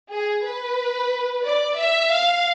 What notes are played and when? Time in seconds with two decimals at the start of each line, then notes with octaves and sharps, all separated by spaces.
0.10 G#4
0.44 B4
1.44 D5
1.77 E5
2.11 F5